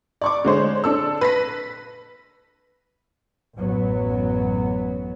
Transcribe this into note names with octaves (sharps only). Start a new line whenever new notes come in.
D5 C#6 D6
D3 G#3 C5 C#5
D4 A4 E6
B4 A#6 B6
A1 F#2 F#3 B3